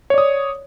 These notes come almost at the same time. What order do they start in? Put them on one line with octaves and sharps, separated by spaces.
C#5 D5 D#6